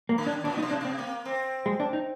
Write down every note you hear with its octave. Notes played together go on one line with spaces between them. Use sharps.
A#3
D3
D4
A#2 D4
D#4
C3
D4
C3 C4
A#3
C4
G#3
D4
D#4